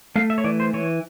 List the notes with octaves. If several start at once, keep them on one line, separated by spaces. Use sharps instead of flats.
A3 F5
E5
C#5
E3 D5
C5
E3 C#5